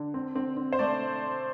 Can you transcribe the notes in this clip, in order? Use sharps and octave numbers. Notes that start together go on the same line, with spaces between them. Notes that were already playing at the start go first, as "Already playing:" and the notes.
Already playing: D3
C4
C4
C4
C5
A3 D5